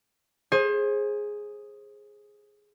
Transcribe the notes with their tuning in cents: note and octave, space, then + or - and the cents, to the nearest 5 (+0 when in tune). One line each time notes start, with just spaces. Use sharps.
G#4 +0 C5 +30